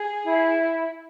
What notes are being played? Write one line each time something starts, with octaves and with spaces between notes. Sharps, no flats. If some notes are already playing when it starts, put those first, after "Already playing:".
Already playing: G#4
E4